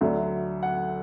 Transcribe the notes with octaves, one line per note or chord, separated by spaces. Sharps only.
D2 D3 F#3 E5
F#5